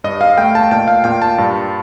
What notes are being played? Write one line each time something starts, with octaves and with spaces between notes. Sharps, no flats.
G2 D#5
F5
A3 G5
A5
A#2 G5
F5
A#2 G5
A5
G2